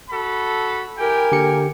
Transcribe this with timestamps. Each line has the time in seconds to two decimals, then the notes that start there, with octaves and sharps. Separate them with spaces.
0.10 F#4 A4 B5
0.98 E4 G4 A#4 G5 G#5
1.32 D3 A#3 G4 C#7